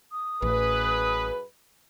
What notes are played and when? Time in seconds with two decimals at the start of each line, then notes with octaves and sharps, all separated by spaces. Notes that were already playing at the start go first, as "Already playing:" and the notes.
0.12 D#6
0.42 A1 F#2 G#4 B4